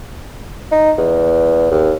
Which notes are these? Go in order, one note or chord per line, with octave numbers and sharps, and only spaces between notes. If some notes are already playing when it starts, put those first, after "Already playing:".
D#4
E2
D#2